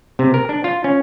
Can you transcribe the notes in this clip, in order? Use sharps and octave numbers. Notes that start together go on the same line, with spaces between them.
C3
A#4
D4
F4
C#4